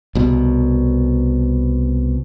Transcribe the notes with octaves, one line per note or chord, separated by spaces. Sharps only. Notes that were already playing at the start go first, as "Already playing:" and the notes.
C2 B2